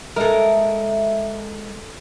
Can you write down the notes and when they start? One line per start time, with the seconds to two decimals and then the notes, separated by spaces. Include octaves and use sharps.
0.16 G#3 A#3 A4 A#4 E5